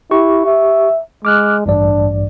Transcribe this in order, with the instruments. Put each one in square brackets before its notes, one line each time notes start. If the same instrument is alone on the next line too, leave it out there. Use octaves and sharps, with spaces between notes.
[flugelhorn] E4 [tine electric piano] G4 C#6
[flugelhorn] E5
[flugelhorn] G#3 [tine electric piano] D6 F6 F#6
[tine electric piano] A1 G2 D5 [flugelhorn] D4